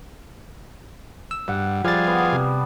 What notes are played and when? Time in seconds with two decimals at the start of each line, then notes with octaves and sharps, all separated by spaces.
1.31 E6
1.48 G2 F#5
1.84 F3 G3 F4 G#4 A6
2.07 B3
2.33 C3 A5